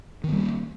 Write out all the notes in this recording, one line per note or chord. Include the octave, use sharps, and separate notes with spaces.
D#3 G3 A#3 B3